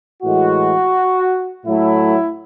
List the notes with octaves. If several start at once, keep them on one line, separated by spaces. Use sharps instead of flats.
A2 E3 G#3 F#4
A2 F#3 A3 E4